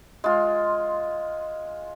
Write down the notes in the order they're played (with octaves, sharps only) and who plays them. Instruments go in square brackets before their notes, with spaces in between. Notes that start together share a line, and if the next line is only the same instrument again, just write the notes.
[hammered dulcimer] G#3 F4